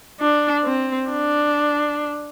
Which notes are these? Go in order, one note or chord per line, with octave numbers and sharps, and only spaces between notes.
D4
C4
D4